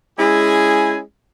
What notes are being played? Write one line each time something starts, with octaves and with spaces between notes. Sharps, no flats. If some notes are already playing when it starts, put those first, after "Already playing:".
G#3 C#4 E4 G#4 G#5